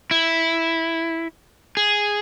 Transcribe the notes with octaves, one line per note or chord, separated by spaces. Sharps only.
E4
G#4